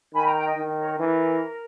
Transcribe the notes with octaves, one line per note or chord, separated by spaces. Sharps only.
D#3 G#5 B5
G5 A#5
G5 A#5
D#5 G5
D#3
A#4 C#5
E3 A#4